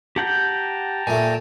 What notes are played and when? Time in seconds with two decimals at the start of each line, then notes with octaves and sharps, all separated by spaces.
0.16 G4 F#5 G5 A5 A#5 G6
1.07 A#2 A3 G#5